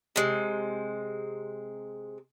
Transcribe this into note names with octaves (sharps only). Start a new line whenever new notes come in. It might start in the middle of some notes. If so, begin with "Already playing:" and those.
C3 G#3